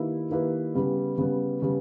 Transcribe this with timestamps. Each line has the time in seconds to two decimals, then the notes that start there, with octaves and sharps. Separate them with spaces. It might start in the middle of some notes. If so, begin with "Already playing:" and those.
Already playing: D#3 A#3 E4 G4 B4
0.30 D#3 A#3 E4 G4 B4
0.74 C#3 G3 B3
1.18 C#3 G3 B3
1.62 C#3 G3 B3